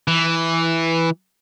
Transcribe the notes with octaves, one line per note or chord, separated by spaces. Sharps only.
E3